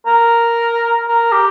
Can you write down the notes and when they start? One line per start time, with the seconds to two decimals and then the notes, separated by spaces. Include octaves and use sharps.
0.06 A#4
1.08 A#4
1.32 G4